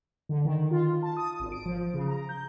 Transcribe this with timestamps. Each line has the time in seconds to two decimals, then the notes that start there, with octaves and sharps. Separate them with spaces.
0.29 D3
0.45 D#3
0.71 F4
1.03 A5
1.17 D#6
1.40 G#1
1.52 D7
1.66 F3
1.94 C#3
2.08 A#5
2.29 G6